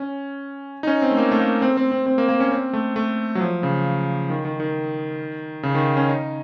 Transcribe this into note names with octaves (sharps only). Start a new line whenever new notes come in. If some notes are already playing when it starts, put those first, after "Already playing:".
Already playing: C#4
D#4
C#4
C4
A3
A#3
A3
A#3
C4
C4
C4
C4
A#3
A#3
C#4
C4
A3
A3
F#3
F3
C#3
D#3
D#3
D#3
C#3
D#3
C#4
D#4